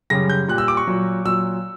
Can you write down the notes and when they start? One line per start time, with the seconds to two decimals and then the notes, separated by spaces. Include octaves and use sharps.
0.10 F#2 C#3 G3 A#6
0.30 G6
0.48 A#2 G3 F#6
0.58 E6
0.68 D6
0.77 C#6
0.87 A#2 F#3
1.25 A#2 F#3 E6